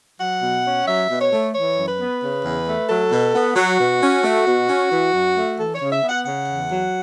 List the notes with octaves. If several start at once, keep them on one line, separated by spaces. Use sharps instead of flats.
F#3 F#5
B2
C#4
F#3 E5
B2
C#5
A3
E3 C#5
F#2
B4
B3
C#3
E2
A3
F#3 A4
B2
B3
F#3 F#4
B2
C#4
A3
B2
C#4
E3
F#2
A3
E3 A4
C#5
C#3
E5
B3
F#5
C#3 F#5
E2
F#3